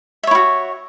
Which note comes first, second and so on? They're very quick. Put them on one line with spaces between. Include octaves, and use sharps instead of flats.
E5 C#5 E4 F#4